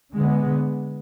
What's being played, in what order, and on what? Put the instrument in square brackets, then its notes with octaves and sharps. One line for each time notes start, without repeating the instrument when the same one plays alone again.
[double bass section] D3 G#3 B3